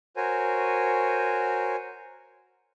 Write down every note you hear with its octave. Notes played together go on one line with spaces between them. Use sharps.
F#4 A#4 C5 C#5 G#5